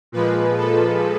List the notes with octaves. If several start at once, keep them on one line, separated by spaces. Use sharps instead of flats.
A#2 F3 G#3 B4
A4